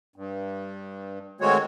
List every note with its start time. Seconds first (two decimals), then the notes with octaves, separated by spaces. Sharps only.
0.16 G2
1.41 D#3 G#3 A3 C4 F#4 C#5